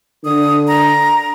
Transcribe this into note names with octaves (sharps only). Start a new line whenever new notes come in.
D3 D#6
A#5